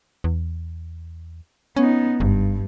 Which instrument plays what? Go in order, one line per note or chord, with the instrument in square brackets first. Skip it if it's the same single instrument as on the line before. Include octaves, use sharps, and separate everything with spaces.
[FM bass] E2
[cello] B3 D#4 [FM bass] C#4
[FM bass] F#1 [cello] G2